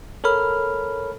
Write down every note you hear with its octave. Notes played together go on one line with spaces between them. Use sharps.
A4 A#4 C#5 B5 F6